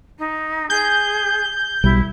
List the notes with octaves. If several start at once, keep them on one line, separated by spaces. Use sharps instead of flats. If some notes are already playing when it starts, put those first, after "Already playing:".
D#4
G#4 G6
B1 G3 E4